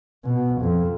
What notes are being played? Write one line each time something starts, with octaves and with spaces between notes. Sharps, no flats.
B2
F2